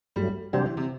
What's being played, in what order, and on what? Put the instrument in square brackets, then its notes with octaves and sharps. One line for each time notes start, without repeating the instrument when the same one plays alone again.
[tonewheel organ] G2 F#3 A3 [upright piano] G3
[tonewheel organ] C3 G3 D4 G4 C5 [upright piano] F#3
[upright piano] E3
C3